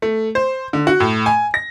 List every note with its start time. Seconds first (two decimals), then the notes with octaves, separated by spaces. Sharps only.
0.02 A3
0.35 C5
0.73 D3
0.87 F#4
1.00 A2
1.26 G#5
1.54 A#6